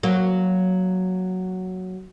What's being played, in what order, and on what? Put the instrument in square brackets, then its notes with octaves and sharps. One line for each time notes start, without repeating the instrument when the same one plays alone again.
[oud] F#3 A#3